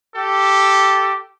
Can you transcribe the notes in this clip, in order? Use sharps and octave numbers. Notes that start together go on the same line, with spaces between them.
G4 A4